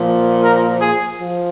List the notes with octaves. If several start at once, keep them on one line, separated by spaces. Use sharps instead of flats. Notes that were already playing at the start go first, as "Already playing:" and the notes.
Already playing: A#2 F3
A#4
G#4
F3